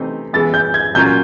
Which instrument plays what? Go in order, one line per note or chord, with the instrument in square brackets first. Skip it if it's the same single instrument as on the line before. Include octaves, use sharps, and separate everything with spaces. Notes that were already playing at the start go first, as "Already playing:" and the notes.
Already playing: [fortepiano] C3 E3 A3 C4 D#4
[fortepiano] E3 G#3 B3 [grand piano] A6
[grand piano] G6
G#6
[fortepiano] A#2 F#3 A#3 C#4 F4 [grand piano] G6